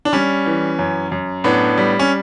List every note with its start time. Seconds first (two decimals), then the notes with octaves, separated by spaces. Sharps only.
0.05 D4
0.13 G3 C#4
0.46 E3
0.79 F#2
1.11 F#2
1.44 A2 B3 D4
1.78 G3
1.99 C#4